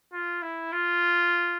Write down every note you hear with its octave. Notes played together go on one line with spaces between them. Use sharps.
F4
E4
F4